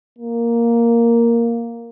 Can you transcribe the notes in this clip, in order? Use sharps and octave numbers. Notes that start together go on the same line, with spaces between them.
A#3